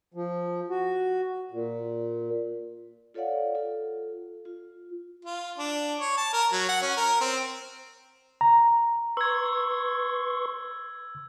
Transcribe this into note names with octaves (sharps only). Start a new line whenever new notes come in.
F3
F#4
A#2
F4 A4 C#5 D5 F5 F#5
F4 A4
F4
F4
D4
C#5
A5
A#4
F#3
F#5
C#4
A#4
C4
A#5
B4 C6 C#6 E6 G#6